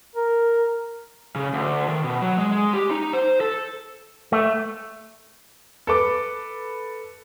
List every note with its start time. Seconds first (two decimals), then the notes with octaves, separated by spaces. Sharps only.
0.15 A#4
1.35 C#3
1.54 D2
1.89 D#3
2.04 B2
2.22 F#3
2.38 G#3
2.51 G#3
2.73 G4
2.91 D#4
3.13 C5
3.40 A4
4.32 A3
5.87 A4 B4 D6